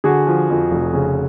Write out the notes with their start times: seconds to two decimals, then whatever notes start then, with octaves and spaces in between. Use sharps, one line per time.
0.04 D3 F#4 G#4
0.27 F3
0.50 F2
0.71 F1
0.94 C#3